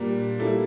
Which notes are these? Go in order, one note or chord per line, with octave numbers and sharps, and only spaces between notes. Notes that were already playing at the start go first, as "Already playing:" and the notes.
Already playing: A#2 G3 A#3 D4
G3 A#3 E4 A4